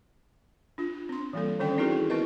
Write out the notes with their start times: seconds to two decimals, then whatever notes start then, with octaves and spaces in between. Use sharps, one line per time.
0.78 D4 F4
1.09 C4 C6
1.33 E3 G3 A#3 D4 A4
1.59 D3 D#3 C#4 A4 D5 G5
1.78 C4 D#4 E4 F#4 G#4 A#4
2.10 B3 E4 A#4 B4 D#5